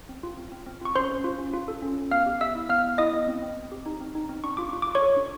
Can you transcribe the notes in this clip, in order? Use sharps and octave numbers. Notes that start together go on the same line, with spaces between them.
C4
F4
C4
C4
C4
F4 C#6
C#4 C5 C6
C#4
F4
C#4
F4
A4
C#4
C#4
B3 F5 F6
G4
B3 E5 E6
E4
B3 F5 F6
B3
E4 D#5 D#6
B3
C4
C4
C4
G4
D#4
C4
D#4
C4
D4 C#6
F4 D6
F4 C#6
F4 D6
C#5 C#6
A4
D4